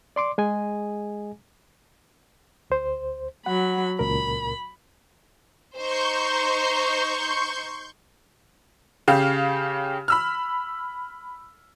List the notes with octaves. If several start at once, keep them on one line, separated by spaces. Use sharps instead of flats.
D5 C6 D6
G#3 G#4 D#5 G#5
D2 C5
F#3 F#5 B5
C#2 A#2 A#4 B5
D#4 C5 C6 C#6 G6
C#3 G4 F5 F6
B5 E6 F6